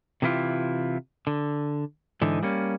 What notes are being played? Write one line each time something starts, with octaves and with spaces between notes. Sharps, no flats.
C3 E3 G#3 E4 F4 G4
D3
G#2 D3 E3 D#4
G3 A#3 C#4